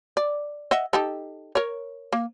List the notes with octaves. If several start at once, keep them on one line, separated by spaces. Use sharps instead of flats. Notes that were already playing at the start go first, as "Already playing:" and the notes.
D5
D#5 E5 F#5
D#4 G4 A4
A#4 C#5
A#3